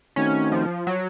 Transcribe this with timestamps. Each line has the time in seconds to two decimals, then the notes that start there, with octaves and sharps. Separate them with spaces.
0.16 D#3 A3 C4 C#4 D#4 F#4
0.52 F3
0.87 F#3